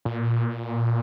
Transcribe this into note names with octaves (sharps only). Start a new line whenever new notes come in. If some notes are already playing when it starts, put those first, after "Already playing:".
A#2